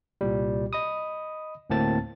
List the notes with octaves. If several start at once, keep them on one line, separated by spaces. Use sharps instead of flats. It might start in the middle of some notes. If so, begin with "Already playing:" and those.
C2 A#2 G3
D#5 B5 D#6
D2 A2 A#3 C4 A5 A6